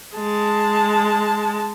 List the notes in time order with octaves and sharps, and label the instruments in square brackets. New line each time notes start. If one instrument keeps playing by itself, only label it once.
[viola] G#3 A5